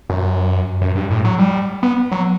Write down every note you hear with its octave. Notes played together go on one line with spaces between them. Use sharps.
F#2
F#2
G2
A2
F#3
G3
B3
F#3